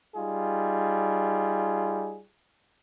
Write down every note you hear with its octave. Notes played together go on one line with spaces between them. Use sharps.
G3 D#4 F4 G#4